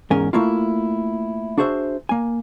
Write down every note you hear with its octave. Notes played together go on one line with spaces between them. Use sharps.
E2 G#2 C#4 A#4 G#5
A3 A#3 E4 F4
D4 F#4 G#4 C5 E5
A#3 G#5